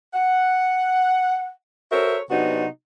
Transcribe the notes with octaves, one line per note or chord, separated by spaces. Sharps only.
F#5
F#4 A4 A#4 C5 C#5 E5
C3 F#3 B3 D4 D#4 F#4